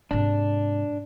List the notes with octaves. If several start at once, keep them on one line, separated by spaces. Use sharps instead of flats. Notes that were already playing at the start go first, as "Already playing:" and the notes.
G#2 C3 D4